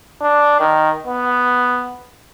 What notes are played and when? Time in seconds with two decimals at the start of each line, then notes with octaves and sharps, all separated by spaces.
0.21 D4
0.60 D#3
1.07 B3